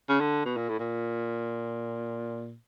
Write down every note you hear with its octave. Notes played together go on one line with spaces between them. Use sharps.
C#3
D3
B2
A#2
A2
A#2